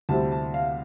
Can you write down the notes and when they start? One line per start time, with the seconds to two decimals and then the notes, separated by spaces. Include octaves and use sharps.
0.09 D2 C3 G3 C4 E4 A5
0.32 A5
0.54 F5